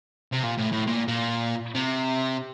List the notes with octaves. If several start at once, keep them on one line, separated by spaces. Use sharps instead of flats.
C3
A#2
A2
A2
A#2
A#2
C3